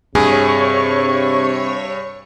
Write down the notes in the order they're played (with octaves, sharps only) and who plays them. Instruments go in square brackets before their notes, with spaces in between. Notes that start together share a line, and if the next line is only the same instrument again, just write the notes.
[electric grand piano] G2 [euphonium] C3 [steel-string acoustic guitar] G#4 [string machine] C#5 C#6